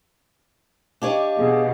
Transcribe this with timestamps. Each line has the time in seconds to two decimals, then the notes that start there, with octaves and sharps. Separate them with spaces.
1.02 D4 G4 C#5 D#5 F5
1.38 B2 G#4